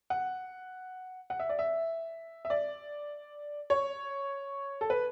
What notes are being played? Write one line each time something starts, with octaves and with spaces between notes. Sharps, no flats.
F#5
F#5
E5
D5
E5
E5
D5
C#5
A4
B4